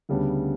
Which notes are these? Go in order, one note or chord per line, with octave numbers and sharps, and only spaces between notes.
D2 C#3 G3 B3 D4